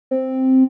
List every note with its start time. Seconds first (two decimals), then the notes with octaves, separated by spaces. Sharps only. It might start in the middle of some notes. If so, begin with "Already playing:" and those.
0.11 C4